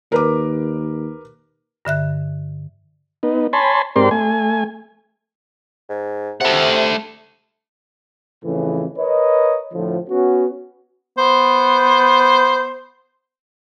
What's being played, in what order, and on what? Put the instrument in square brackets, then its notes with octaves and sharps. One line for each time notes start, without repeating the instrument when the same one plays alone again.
[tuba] D#2 [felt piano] A#4 B4 D6
[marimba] G2 D3 E5 F#6
[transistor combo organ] B3 D#4
C#5 G#5 A5 B5 C6
G#2 C4 G4 A#4 D5 C6
A3 G#5
[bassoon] G#2
[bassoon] C3 [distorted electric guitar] A3 F#5
[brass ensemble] F2 A2 C#3 E3
A#4 B4 C#5 D#5
A2 D3 F3
B3 C#4 F#4
[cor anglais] B3 [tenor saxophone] C5